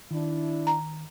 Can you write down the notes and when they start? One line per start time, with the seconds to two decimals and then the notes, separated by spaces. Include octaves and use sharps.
0.11 D#3 D4 E4
0.67 A#5